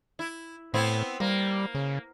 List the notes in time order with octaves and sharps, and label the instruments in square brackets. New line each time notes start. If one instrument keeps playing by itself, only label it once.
[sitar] E4
[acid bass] A2 [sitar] B3 C4 E4
[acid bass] G3 [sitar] A#3
[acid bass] C#3